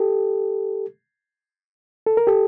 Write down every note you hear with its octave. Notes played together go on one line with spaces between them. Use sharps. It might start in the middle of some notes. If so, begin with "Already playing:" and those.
Already playing: G4 A4
A4
A#4
G4 A4